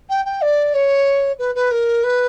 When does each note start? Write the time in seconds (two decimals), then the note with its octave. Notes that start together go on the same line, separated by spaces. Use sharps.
0.09 G5
0.25 G5
0.41 D5
0.73 C#5
1.38 B4
1.54 B4
1.70 A#4
2.03 B4